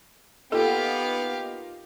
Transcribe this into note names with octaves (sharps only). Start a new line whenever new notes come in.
A#3 B3 D#4 F4 G4 A4 F5